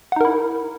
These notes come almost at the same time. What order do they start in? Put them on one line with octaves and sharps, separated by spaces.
F#5 D#4 A#4 E4